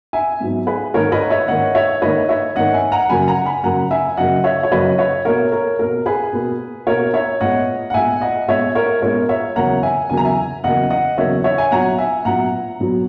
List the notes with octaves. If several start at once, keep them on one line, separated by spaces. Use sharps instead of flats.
E5 G#5
G#2 F#3 B3
G#4 B4
G#2 D#3 A#3 A#4 C#5
B4 D#5
C#5 E5
G#2 D#3 A#3 D#5 F#5
C#5 E5
G#2 D#3 A#3 B4 D#5
C#5 E5
G#2 D#3 A#3 D#5 F#5
E5 G#5
F#5 A#5
F#2 C#3 F#3 A#3 G#5 B5
F#5 A#5
G#5 B5
F#2 C#3 F#3 A#3 F#5 A#5
E5 G#5
F#2 C#3 F#3 A#3 D#5 F#5
C#5 E5
C#5
F#2 C#3 F#3 A#3 B4 D#5
C#5 E5
B2 A#3 A#4 C#5
A#4
B2 A#3 A#4
G#4 B4
B2 A#3
B2 A#3 A#4 C#5
C#5 E5
A#2 G#3 B3 D#5 F#5
F#5
A#2 G#3 B3 E5 G#5
D#5 F#5
A#2 G#3 B3 C#5 E5
A#4 C#5
A#2 G#3 B3 A#4 C#5
C#5 E5
E2 C#3 F#3 A#3 F#5 A#5
E5 G#5
E2 C#3 F#3 A#3 G#5
A#5
E5 G#5
E2 C#3 F#3 A#3 D#5 F#5
D#5 F#5
E2 C#3 F#3 A#3 C#5 E5
C#5 E5
E5 G#5
A#2 F#3 B3 F#5 A#5
E5 G#5
A#2 F#3 B3 F#5 A#5
A#2 F#3 B3